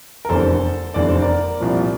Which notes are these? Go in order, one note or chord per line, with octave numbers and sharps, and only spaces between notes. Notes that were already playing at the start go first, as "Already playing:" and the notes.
A#4
F1 E2 D3 A4 C5
F1 E2 D3 D5
C5
A#4 D5
C2 A#2 F3